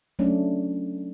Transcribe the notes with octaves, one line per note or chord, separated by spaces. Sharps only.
F#3 A3 C#4 D4